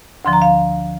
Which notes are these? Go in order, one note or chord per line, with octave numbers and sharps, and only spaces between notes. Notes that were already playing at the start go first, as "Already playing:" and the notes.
D2 D3 F3 C6
A#5
F5